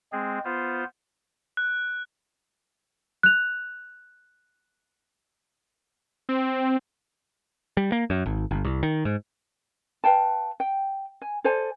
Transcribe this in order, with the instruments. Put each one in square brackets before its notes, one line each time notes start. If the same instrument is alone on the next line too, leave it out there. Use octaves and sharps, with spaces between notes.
[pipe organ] G#3 C4 G#4
B3 F4 C5
[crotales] F#6
[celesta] F#6 F7
[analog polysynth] C4
[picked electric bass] G3
A#3
F#2
G#1
G1
C2
D#3
G#2
[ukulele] B4 F5 G5 A5
G5
G#5
A4 C5 D5 G#5